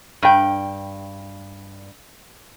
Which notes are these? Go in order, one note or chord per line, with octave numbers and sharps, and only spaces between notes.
G2 G5